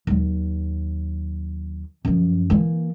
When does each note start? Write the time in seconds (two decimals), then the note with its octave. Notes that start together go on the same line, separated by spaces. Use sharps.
0.07 D#2 F#3
2.05 F#2 F3
2.50 E3 A#3